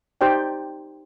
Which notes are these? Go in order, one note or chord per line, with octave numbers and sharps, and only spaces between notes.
D#4 G4 C5 D5 G5